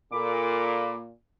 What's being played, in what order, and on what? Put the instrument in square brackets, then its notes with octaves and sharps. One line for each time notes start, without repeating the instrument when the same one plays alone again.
[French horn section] A#2 [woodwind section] A4 B5 D6